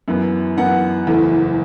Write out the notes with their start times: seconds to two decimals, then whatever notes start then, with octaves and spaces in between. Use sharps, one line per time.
0.08 F#2 E3 B3
0.57 F#2 E3 B3 F#5
1.07 F#1 E2 E3 A3